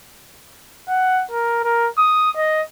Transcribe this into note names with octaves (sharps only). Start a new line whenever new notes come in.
F#5
A#4
A#4
D#6
D#5